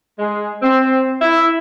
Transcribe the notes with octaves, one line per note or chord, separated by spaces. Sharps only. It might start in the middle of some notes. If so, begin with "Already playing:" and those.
G#3
C4
E4